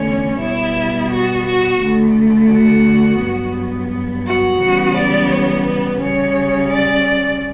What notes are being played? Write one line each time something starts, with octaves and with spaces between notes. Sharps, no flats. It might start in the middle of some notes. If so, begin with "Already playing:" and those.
Already playing: E2 D3 A3 C#4 C#5
B2 G3 B3 E4
F#4
F#4
D2 D3 A3
F#4
G2 F#3 B3
F#4
C#3 E3 G3 B3
D5
C#5
B4
C#3 G3 C#4 C#5
D5